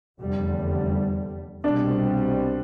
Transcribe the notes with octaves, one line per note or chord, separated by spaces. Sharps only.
F1 E2 D3 G3
C2 B2 G3 C4 D4